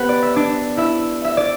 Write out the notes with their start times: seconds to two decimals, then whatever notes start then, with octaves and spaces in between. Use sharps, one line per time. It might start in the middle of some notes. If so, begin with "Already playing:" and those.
Already playing: B3 G4 B4
0.09 D5
0.23 E5
0.36 D4 D5
0.77 E4 E5
1.25 E5
1.37 D5